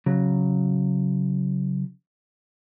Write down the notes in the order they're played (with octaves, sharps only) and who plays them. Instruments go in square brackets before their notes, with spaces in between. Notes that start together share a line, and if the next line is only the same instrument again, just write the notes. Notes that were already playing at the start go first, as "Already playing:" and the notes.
[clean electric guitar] C#3 F#3